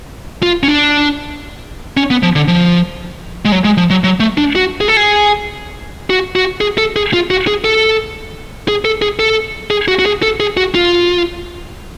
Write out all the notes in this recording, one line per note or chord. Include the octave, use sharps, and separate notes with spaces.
F4
C#4
D4
C#4
B3
F3
D3
F3
G#3
F#3
G#3
F3
F#3
F#3
A3
D4
F#4
G#4
A4
G#4
F#4
F#4
G#4
A4
G#4
F4
F#4
G#4
A4
G#4
A4
G#4
A4
G#4
F#4
F#4
G#4
A4
G#4
F#4
F4